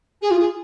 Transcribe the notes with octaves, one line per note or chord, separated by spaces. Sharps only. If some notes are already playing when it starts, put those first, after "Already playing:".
G#4
F4
G#4